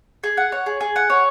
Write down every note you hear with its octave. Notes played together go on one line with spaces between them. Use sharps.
G#4
F#5
C#5
G#4
G#4
F#5
C#5